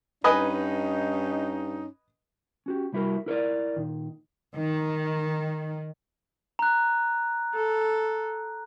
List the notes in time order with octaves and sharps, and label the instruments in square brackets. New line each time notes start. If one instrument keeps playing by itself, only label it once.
[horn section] G2 C#4 D#4 [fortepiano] B4 D#5 G#5
[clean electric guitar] C#4 F#4 G4
C2 G3 E4 F#4 A#4
E4 A#4 C#5 D5
A#2 D#3
[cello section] D#3
[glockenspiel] A#5 F#6
[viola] A4